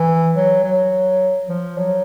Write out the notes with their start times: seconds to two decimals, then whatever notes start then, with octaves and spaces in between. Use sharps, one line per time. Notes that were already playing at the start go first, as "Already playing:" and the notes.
Already playing: E3
0.35 F#3
0.64 F#3
1.49 F3
1.78 F#3